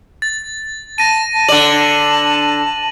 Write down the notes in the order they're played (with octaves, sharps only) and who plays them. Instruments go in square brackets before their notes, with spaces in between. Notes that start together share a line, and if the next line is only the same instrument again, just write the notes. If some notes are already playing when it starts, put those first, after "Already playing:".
[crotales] A6
[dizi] A5 [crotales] A#6 D#7
[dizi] A5
[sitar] D3 D5 [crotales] F#7